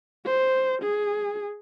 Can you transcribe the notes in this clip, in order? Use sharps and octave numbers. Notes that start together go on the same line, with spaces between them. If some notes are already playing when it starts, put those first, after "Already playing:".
C5
G#4